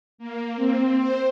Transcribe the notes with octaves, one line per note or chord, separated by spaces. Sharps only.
A#3
C4
C5